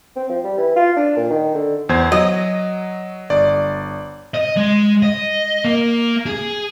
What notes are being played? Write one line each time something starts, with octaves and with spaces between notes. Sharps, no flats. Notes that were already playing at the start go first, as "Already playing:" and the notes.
C4
F3
G3
E3
F4
D4
A#2
D#3
D3
E2 C5 G#6
F#3 D#5
G1 D5
D#5
G#3
D#5
A#3
G#4